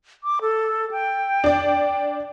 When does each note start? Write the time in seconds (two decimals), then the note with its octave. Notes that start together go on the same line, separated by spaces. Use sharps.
0.24 D6
0.41 A4
0.91 G5
1.44 D4 D5